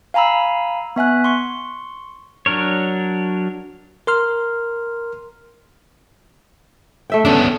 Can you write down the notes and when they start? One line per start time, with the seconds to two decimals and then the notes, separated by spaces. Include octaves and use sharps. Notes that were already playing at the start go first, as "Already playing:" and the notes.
0.14 F5 G#5 A#5 B5 E6
0.96 B3 E5 G#5 F#6
1.24 C6 C#6
2.46 F#3 D4 A#4 C#5
4.07 A#4 C6 F6
7.10 A3 E5 G5
7.25 B3 C#4 D4 A4